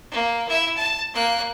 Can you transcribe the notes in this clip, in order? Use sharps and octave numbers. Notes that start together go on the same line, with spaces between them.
A#3
E4 E5
A5
A#3 F#6